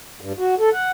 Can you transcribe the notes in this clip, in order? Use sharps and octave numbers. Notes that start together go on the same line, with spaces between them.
G2
F#4
A4
F#5